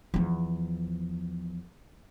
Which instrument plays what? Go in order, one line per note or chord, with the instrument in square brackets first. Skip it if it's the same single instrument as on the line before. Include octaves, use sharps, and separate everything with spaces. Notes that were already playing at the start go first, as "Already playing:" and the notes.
[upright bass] E2 F3